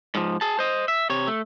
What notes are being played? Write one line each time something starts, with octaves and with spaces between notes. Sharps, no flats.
G#2 F3
G#4 A5
C5 D#5
E5
C3 C#5
A3